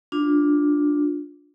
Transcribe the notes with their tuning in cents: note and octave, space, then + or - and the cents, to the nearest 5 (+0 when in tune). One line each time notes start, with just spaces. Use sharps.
D4 +0 F4 +20